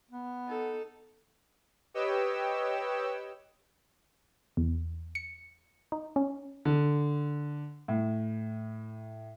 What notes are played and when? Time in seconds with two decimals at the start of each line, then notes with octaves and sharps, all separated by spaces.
0.11 B3
0.48 D#4 A4
1.94 G4 B4 C#5 D#5 G5 E6
4.57 E2
5.15 C#7
5.92 D#4
6.16 C#4
6.65 D3
7.88 A2